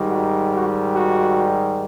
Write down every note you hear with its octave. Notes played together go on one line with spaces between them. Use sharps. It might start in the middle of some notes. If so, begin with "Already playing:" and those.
Already playing: G#2 D#3 G3
F#4
F#4
F#4